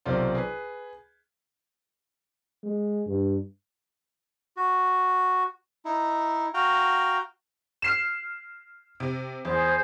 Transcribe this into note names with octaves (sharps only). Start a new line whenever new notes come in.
B1 C3 D#3 F4 C5 D5
G#4 B4
G#3
G2
F#4
D#4 E4
F#4 F5 G5 A#5
F6 C7 E7
C3
E2 G#4 C5